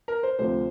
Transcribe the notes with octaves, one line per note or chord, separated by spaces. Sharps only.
A#4
C5
D2 C3 F3 A3 C5